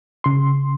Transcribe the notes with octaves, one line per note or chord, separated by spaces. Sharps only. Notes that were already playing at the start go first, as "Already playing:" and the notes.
C#3 C6